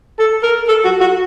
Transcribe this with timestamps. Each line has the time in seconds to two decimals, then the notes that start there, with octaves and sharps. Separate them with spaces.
0.19 A4
0.43 A#4
0.68 A4
0.85 F#4
1.01 F#4